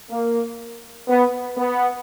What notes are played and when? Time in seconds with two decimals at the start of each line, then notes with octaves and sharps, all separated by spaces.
0.11 A#3
1.08 B3
1.57 B3